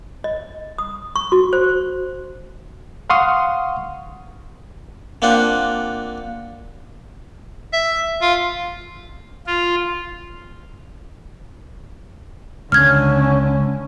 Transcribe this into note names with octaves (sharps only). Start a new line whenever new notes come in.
D#5
D#6
C#6
F#4
C5
F5 F#5 C6 C#6 D#6 F6
A#3 C4 D4 F4 F#5 G5
E5
F4
F4
C#2 D3 C#4 F6 G#6